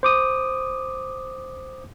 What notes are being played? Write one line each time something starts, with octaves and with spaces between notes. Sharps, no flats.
C5 D6 D#6